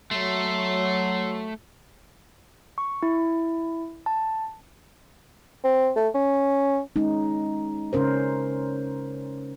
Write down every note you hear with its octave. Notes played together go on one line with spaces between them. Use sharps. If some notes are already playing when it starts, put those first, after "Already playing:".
F#3 A3 C6
C#6
E4
A5
C4
A3
C#4
G#3 C#4 D#4
C#3 C#4 A#4 C5